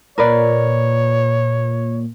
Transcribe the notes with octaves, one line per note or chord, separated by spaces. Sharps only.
A#2 A#4 B4 C#5 D5